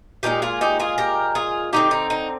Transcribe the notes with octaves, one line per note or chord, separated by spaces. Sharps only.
A#2 F3 G#3 D#4 G4
F4 G#4
D#4 G4
F4 G#4
G4 A#4
F4 G#4
D3 G#3 C4 D#4 G4
D#4
D#4